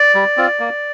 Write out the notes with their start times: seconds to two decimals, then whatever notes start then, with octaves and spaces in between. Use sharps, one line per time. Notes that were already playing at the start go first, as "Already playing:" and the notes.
Already playing: D5
0.15 G3
0.37 C4 F4
0.59 A#3